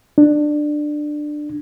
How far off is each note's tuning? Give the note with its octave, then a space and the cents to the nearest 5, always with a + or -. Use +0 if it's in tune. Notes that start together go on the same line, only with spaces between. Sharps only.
D4 +20